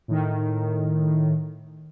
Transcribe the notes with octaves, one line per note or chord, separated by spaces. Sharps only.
A2 D#3